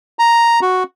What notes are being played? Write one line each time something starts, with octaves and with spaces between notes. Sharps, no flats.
A#5
F#4